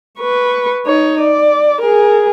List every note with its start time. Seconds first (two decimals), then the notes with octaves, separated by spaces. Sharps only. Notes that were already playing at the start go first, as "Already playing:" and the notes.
0.19 B4 C#6
0.86 D#4 C#5
1.21 D5
1.81 G#4 A#4